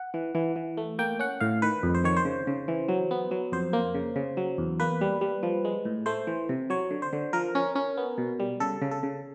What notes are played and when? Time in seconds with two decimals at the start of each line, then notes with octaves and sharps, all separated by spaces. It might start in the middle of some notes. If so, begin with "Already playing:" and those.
Already playing: F#5
0.14 E3
0.35 E3
0.56 E3
0.77 A3
0.99 A#3 G5
1.19 C#4 F#5
1.40 A2 F5
1.62 D#3 B4
1.83 F2
1.95 C5
2.04 D#3 C#5
2.17 C5
2.25 C#3
2.47 C#3
2.68 E3
2.89 F#3
3.11 B3
3.31 F#3
3.52 F2 C5
3.73 A#3
3.95 C#3
4.16 C#3
4.37 F#3
4.58 E2
4.80 A#3 B4
5.01 G3
5.21 G3
5.43 F3
5.65 G#3
5.85 A2
6.06 A3 C5
6.27 E3
6.49 C3
6.70 F#3 C#5
6.91 D3
7.02 C5
7.13 D3
7.33 F3 A#4
7.55 C#4
7.75 C#4
7.97 B3
8.18 B2
8.40 G3
8.60 C#3 A4
8.82 C#3
8.91 A4
9.03 C#3